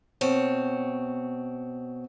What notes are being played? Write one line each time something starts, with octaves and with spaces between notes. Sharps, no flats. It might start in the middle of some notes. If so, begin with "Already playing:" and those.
B2 C4 C#5